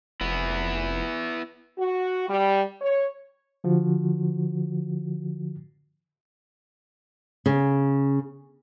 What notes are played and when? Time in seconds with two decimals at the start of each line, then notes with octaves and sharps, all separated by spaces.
0.21 F1 B3 E4
1.78 F#4
2.28 G3
2.81 C#5
3.64 D3 F3 F#4
7.46 C#3